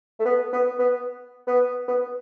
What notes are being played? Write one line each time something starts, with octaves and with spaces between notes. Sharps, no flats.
A3
B3
B3
B3
B3
B3